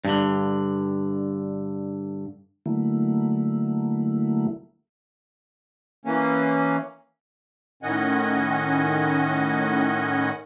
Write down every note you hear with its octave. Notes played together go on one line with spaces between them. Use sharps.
G2 D3
D3 F#3 A3 A#3 E4
E3 A#3 C#4
A2 D#3 C#4 D#5 F#5 G#5